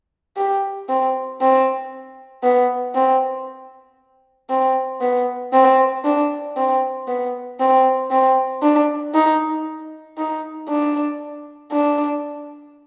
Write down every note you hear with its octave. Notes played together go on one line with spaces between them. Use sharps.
G4
C4
C4
B3
C4
C4
B3
C4
D4
C4
B3
C4
C4
D4
D#4
D#4
D4
D4